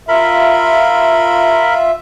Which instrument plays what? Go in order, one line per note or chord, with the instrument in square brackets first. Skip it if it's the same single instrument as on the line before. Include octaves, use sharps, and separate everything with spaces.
[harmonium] F4 E5 [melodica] A#4 B5